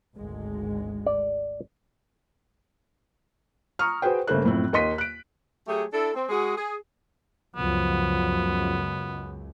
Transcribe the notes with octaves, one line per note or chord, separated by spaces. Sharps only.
G#1 D2 G#3
D5
A#5 C#6 D#6 F6
F#4 G#4 B4 C5 G5
G1 C#3 A3 A#3 C5 F#6
F#1 A2 F3 C4
D#2 A#3 D#5 C6 B6 D#7
F#6 D7
F#3 A3 G4 G#4
D4 E4 A4
C4
G#3 F#4 G#4
G#4
C#2 F#2 F3 B3